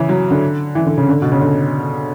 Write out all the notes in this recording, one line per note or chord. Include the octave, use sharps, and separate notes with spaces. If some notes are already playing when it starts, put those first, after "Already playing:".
Already playing: C#3 E3
F#3
D3
E3
D3
C#3
D3
B2
C#3
D3